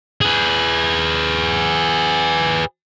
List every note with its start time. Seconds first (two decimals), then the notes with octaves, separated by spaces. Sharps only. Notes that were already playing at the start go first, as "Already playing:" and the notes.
0.21 G#4 B4